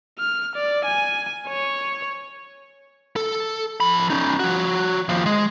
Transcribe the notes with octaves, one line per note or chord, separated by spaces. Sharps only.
F6
D5
G#5
C#5
A4
F3 B5
C#4 D#4
F3 F#4
D#2 F3
G#3